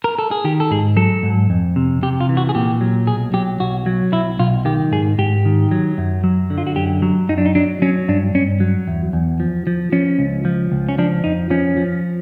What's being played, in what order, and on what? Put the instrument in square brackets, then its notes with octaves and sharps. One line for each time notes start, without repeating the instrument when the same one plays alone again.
[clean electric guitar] A#4
A4
G#4
D#3 G4
A4
G#2 G#4
F#3 A4
G#2
F2
C3
C3 G4
F4
E3
F#4
G#4
A#2 G4
F#3
B1 G#4
F#3 G4
B1 F#4
F#3
B1 E4
B1 F4
D#3 G4
G#2 G#4
G#2 G4
D#3
F#3
F#2
F#3
D3
F4
F#4
F#2 G4
F#3
F#2 D#4
D4
D#4
F#3 D4
F#3 C#4
G2 D4
G2 C#4
F#3
E2
E2
F3
F3
F3 C#4
C#2
F3
C#2
C#4
F3 D4
F2 D#4
F3 C#4
F3